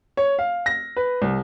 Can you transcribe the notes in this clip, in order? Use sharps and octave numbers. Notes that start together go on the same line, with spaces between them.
C#5
F5
A#6
B4
C2